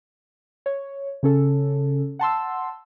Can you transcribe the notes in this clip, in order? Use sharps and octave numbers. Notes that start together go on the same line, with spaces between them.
C#5
C#3 C#4 A4
F#5 A5 C6 E6